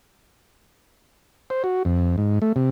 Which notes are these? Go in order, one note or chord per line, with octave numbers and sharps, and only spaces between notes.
C5
F#4
F2
G#2
A3
C3